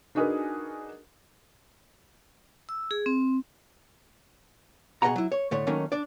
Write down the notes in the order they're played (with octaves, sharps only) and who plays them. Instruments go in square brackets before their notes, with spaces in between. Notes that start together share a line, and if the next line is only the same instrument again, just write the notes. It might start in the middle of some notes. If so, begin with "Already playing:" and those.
[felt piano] D4 D#4 F#4 G#4 A#4 B4
[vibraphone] E6
G#4
C4
[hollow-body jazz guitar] B2 G#4 D#5 E5 F#5 A#5
F#3 E4
C#5
A2 D3 A3 C#5
D#3 F#3 A3 A#3 C#4 D#4
D4 D5